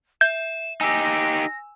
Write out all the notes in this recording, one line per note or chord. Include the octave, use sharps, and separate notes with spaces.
E5 G6 E7
D#4 G4 G#5 E6 A#6